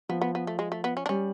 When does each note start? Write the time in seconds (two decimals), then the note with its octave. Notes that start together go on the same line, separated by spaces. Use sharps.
0.09 F3 B3
0.21 B3
0.35 B3
0.47 A3
0.59 G#3
0.72 A3
0.84 B3
0.97 C#4
1.06 D4
1.09 G3 C#4